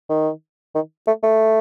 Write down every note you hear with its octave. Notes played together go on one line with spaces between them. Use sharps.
D#3
D#3
A3
A3